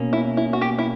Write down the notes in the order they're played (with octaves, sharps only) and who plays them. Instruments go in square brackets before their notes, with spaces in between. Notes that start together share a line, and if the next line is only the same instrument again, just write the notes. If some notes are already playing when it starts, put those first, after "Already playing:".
Already playing: [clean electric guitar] B2 A#3 C#4
[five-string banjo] E4
E4
F#4
G4
E4